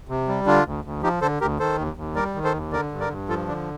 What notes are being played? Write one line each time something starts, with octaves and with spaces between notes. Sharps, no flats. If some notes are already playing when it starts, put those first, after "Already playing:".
C3
G3
D3 D4 F4
D2
D2
F3 D#4 G4
D3 A4 C5
D2 G4 A#4
D#3 A4 C5
D#2
D#2
G3 A#4 D5
D#3
A4 C5
D#2
D3 A#4 D5
G2
A#4 D5
G2
F3 F4 A4
D3 D4